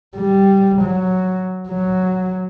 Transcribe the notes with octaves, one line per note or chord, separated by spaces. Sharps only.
G3
F#3
F#3